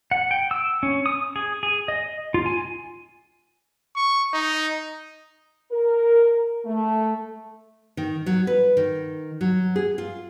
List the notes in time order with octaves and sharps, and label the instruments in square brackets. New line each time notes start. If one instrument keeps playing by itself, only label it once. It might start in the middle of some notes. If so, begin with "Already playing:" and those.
[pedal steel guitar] F#5
G5
E6
C#4
D#6
G#4
G#4
D#5
F4
G#5
[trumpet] C#6
D#4
[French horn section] A#4
A3
[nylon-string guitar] D#3
F#3
B4
D#3
F#3
G#4
F4